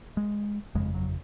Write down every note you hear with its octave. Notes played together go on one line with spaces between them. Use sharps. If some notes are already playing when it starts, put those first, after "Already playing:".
G#3
G1 F2 C#3 G#3
F#3